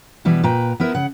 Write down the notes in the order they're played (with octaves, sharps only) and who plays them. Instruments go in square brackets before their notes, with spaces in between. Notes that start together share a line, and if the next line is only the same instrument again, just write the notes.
[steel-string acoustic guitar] B2 E3 G3 B3
A#2 B4 G5 A#5
B3 E4 A#4
C#3 F#5